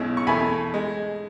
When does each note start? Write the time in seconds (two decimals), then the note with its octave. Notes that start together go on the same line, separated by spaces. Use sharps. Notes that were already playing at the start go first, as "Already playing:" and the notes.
Already playing: B1 B2 G#3 C#4 E4
0.17 C#6
0.27 E2 B2 A3 G#5 B5
0.74 G#3